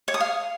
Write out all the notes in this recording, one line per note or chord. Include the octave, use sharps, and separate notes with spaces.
C#5
D#6
F5